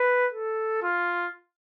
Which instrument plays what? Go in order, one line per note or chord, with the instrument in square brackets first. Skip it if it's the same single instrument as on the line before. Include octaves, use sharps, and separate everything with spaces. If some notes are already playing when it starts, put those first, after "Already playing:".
Already playing: [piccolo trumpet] B4
A4
F4